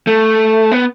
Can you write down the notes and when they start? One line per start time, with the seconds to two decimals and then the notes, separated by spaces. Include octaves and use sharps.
0.07 A3
0.71 B3